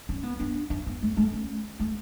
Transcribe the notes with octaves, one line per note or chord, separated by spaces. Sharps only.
C#4
B3
D4
D4
B3
A3
A3
C#4
A3